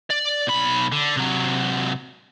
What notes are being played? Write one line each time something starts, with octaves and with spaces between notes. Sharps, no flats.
D5
B1 B5
D3
C3 F#3